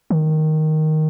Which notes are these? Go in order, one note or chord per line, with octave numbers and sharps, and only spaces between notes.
D#3